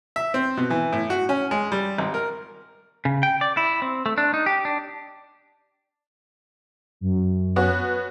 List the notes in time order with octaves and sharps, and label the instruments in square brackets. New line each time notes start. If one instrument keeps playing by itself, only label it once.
[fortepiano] E5
C4
B2
E3
A2
F#4
C#4
G#3
G3
G#1
A#4
[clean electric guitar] C#3
G5
D5
E4
C4
A3
D4
D#4
G4
D4
[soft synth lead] F#2
[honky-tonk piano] B3 C#4 F#4